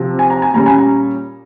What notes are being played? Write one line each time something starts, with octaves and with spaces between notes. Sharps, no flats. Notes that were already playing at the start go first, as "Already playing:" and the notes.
Already playing: C3 F3 C4
G#5
A#5
G#5
A#2 G3 C#4 A#5
G#5
A#5